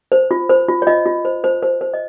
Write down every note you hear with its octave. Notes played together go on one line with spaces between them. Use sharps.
C5
F4
C5
F4
C#5
F4 D#5
F4
C5
C5
C5
C5
D#5